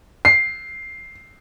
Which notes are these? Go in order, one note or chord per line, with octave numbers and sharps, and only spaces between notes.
C7